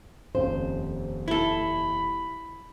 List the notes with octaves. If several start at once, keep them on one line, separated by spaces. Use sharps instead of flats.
D#1 F2 C#3 C5
E4 A4 B5